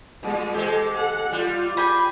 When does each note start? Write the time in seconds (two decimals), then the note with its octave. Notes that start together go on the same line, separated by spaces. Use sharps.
0.23 A#2 G#3
0.54 G#3 G4 A4 C5
0.94 A4 F#5
1.32 G3 F4
1.77 G#4 G5 B5